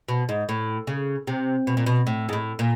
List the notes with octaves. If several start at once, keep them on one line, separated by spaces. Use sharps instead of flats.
B2
G#2
A2
C#3
C3
B2
A#2
B2
A2
G#2
A2
A#2